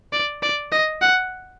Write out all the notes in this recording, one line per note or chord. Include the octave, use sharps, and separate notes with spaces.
D5
D5
D#5
F#5